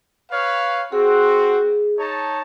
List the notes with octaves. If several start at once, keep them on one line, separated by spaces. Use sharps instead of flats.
B4 C#5 F5
C4 F#4 G#4
D#4 C#5 A5